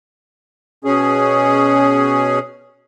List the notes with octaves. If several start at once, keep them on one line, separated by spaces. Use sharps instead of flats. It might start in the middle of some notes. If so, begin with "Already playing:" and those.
B2 C#4 G#4